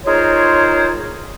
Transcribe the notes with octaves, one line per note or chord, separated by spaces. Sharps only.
D#4 F4 G#4 A#4 C5 C#5